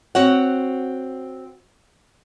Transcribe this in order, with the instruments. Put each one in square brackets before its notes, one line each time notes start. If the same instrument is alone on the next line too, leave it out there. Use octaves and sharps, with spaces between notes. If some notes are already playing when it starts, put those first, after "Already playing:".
[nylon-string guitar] C4 F#4 C#5 F#5